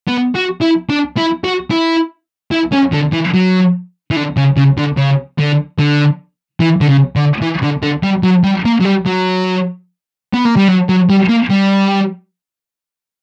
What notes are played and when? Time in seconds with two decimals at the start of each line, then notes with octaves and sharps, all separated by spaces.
0.08 B3
0.36 F#4
0.62 E4
0.90 D4
1.17 E4
1.44 F#4
1.71 E4
2.53 E4
2.73 C#4
2.93 D3
3.13 E3
3.34 F#3
4.11 E3
4.16 D3
4.37 C#3
4.57 C#3
4.78 D3
4.97 C#3
5.39 D3
5.79 D3
6.60 E3
6.81 D3
6.88 C#3
7.16 D3
7.42 E3
7.63 D3
7.83 D3
8.03 G3
8.23 F#3
8.44 G3
8.65 A#3
8.80 F#3
8.85 G3
9.06 F#3
10.34 B3
10.45 A#3
10.56 G3
10.68 F#3
10.89 F#3
11.10 G3
11.29 A#3
11.50 G3